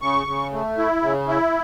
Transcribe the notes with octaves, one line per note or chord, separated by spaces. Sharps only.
C#3 C#6
C#3
A3
E4
C#3
E4